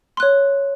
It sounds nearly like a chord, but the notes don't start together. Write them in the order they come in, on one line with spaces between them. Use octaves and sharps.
C6 F#6 C#5